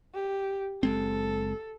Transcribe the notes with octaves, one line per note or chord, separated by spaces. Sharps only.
G4
F#1 G#3 C4 A4